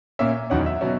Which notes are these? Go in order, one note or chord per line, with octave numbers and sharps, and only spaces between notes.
A#2 A#3 C#4 E5
E2 D#3 F#3 C#4 F#5
E5
B2 F#3 C#4